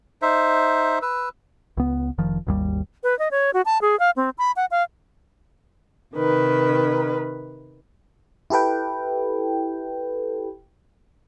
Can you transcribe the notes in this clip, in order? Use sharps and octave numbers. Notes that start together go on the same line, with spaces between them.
D#4 C5 E5
B4 E6
C#2 B3
F1 D#3 F3
G#1 D#2 G3
B4
D#5
C#5
F#4
A5
G#4
F5
C4
B5
F#5
F5
C3 D#3 B4
E4 G4 A4 B4 G5